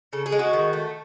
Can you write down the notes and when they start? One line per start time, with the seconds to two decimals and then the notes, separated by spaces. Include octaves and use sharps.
0.13 C#3 A4
0.26 G#4
0.32 G#3
0.39 F#4
0.53 D#3
0.73 A3